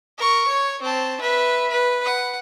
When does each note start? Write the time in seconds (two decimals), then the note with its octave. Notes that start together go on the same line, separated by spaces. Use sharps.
0.18 A#4 C#6
0.48 C#5
0.82 C4 A5
1.21 B4 E5
1.70 B4
2.04 F#5